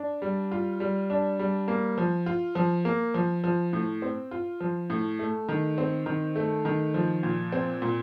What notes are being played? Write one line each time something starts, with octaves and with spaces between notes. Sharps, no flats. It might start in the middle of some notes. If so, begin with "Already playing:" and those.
Already playing: D4
G3
F4
G3
D4
G3
A#3
F3
F4
F3
A#3
F3
F3
A2
C4
F4
F3
A2
A3
D#3
C4
D#3
A3
D#3
F3
A#2
C4
A#2